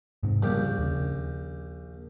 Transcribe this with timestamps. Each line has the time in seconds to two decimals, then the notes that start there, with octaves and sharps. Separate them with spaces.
0.23 G#2 C3 D#3
0.43 A#1 C#3 G3 G4
0.79 D#2 C#3